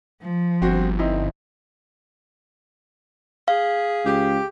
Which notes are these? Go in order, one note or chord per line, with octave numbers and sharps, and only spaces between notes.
F3
G1 C4 F#4
C4 D#4 E4
G#4 F5
C#2 G4